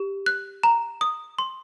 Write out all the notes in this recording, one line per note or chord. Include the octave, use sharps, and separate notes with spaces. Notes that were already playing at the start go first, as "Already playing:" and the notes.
Already playing: G4
F#6
A#5
D#6
C6